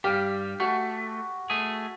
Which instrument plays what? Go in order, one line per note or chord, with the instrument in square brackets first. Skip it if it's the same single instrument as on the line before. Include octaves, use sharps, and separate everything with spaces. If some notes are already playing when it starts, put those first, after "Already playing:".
[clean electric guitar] G2 G3 [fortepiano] G4 [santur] F5
[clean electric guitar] A3 [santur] F#4 G#5
[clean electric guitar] A3 G#4